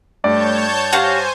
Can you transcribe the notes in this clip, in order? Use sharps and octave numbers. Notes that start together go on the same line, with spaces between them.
G2 A3 C#5 D5 A5 G6
F#4 G4 C5 F5 G#5